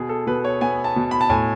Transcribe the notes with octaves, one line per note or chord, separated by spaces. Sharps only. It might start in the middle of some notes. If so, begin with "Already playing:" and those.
Already playing: B2 G#4
A4
B2 B4
C#5
B3 G#5
A5
B2
B5
A5
A2 G#5